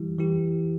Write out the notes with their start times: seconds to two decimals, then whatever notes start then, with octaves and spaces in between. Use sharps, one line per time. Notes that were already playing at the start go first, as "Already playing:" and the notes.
Already playing: E3 G3 E4 G4
0.18 E3 G3 E4 G4